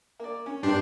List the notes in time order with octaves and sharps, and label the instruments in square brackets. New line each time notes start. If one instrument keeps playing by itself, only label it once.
[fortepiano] A#3 D5
C#4
[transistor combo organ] G2 G4 C6 [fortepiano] A#3 B3 [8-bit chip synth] D4